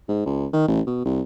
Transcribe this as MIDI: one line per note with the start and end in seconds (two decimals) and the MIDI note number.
0.09 0.25 44
0.26 0.46 37
0.53 0.65 51
0.68 0.80 33
0.87 1.05 47
1.05 1.21 36